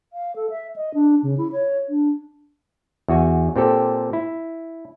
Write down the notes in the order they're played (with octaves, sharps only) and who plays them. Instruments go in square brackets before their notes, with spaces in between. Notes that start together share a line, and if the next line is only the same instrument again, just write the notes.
[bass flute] F5
A4
E5
D#5
D4
C#3
E4
C#5
D4
[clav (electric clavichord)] E2 F#4 G#5
A#2 C4 G4 A4
E4